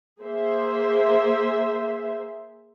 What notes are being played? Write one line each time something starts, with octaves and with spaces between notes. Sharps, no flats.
A#3 G#4 C5 E5